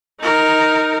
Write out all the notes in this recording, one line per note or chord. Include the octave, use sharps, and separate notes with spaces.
D#4 A#4